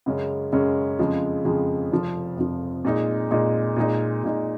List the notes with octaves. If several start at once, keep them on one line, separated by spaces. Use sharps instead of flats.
F#2 C#3 G#3 C#4
F#2 C#3 G#3 C#4
F2 C#3 F3 G#3
F2 C#3 F3 G#3
F1 F2 F3
F1 F2 F3
A#2 G#3 D#4
A#2 G#3 D#4
A#2 G#3 D#4
A#2 G#3 D#4